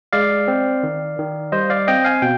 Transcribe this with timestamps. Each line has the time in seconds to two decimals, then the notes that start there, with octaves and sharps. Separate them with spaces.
0.13 G#3 D5 F5
0.48 C4
0.83 D#3
1.18 D#3
1.52 G3 C5 D#5
1.70 D5 F5
1.87 C4 D#5 G5
2.05 F5 G#5
2.22 B2 G5